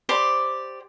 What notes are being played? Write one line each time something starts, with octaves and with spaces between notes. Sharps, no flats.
G4 C5 D5 B5